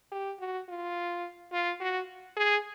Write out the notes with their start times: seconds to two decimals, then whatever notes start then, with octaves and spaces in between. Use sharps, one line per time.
0.12 G4
0.40 F#4
0.68 F4
1.52 F4
1.81 F#4
2.36 G#4